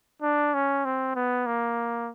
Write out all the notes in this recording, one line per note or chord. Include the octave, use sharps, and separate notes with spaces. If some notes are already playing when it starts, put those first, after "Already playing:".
D4
C#4
C4
B3
A#3